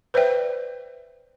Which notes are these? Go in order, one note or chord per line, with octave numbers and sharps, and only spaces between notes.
B4 C5 D5 E5 G5